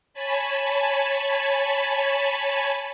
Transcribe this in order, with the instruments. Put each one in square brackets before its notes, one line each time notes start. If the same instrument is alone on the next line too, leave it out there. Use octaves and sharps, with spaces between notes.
[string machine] C#5 G#5 A5 B5